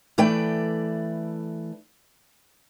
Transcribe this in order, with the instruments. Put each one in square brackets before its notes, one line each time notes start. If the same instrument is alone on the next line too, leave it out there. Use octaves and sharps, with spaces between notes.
[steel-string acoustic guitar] E3 A3 B4 D5 G5